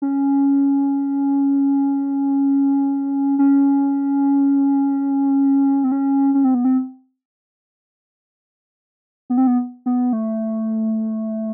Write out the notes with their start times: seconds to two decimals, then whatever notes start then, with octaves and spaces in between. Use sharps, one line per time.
0.02 C#4
3.39 C#4
5.84 C4
5.92 C#4
6.34 C#4
6.44 C4
6.54 B3
6.65 C4
9.30 B3
9.38 C4
9.47 B3
9.86 B3
10.13 A3